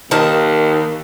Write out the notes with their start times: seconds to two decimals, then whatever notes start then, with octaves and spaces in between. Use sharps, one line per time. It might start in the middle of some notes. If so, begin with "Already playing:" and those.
0.11 D#2 D#3 A#4 A5